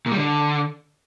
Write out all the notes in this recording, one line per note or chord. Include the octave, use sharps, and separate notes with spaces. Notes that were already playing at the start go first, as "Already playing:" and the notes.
A#2
G3
D3